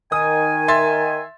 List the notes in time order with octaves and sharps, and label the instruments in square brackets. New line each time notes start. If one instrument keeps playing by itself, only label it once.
[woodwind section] D#3 G#5 [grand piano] D#6
[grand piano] E5 C6 A6